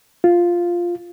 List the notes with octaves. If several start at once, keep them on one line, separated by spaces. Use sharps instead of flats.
F4